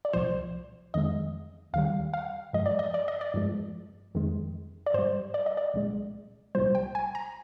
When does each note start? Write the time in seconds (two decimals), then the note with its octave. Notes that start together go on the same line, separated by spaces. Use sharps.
0.05 D5
0.13 C2 A#2 F3 C5
0.94 F2 D#3 G#3 D#5
1.73 D#2 D#3 G3 F5
2.14 F5
2.53 G2 F3 G#3 D#5
2.66 D5
2.79 D#5
2.94 D5
3.08 D#5
3.21 D5
3.34 G2 F3 G#3
4.15 F2 D#3 G#3
4.86 D5
4.94 G#2 G3 C5
5.34 D5
5.46 D#5
5.57 D5
5.74 C2 A#2 G#3
6.55 C2 A#2 G3 C5
6.75 G5
6.95 G#5
7.15 A#5